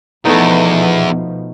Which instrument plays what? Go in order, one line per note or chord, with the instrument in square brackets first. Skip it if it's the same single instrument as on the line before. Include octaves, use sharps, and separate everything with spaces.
[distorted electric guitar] E2 [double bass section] B2 F3 [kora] A3 B3 D#4